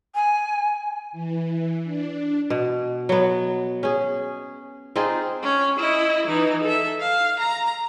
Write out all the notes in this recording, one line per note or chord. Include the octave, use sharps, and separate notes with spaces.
G#5
E3
D4
B2
F#3 B3
C#4 G#4
C4 D#4 F4 G#4
C#4
E4 D#5
E3 D#4
A4 E5
F5
A#5